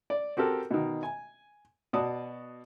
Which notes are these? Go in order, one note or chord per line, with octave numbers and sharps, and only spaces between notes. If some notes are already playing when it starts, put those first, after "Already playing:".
D5
C4 F#4 G4 A4 A#4
B2 D#3
G#5
B2 F#4 D5 A5 D#6